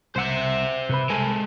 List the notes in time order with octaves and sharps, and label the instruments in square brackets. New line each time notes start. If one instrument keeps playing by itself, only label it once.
[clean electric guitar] C2 F#5 [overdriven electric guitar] C5 E5
[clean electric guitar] C3 B4 B5
[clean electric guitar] C2 A#4 G#5 [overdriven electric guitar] G#3 A4